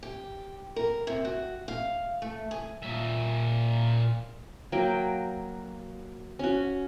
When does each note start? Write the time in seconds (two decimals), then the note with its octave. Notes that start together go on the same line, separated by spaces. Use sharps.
0.03 G4
0.76 A#4
1.07 C3
1.25 F#4
1.68 F5
2.22 A3
2.51 G#4
2.82 A#2 E5
4.72 F#3 A#3 G5
6.39 C#4 F#4